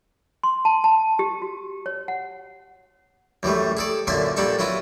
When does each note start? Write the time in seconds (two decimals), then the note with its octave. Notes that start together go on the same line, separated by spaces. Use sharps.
0.43 C6
0.65 A5
0.84 A5
1.19 G4
1.42 F#4
1.86 C#5
2.08 F#5
3.43 F#2 E3 G3 A3
3.77 G#4 A4 D5
4.07 F#2 A#2 D3 E5 G#5 C6
4.37 A#2 G3 D4 A4 C#6
4.59 F#3 B3 E4 F4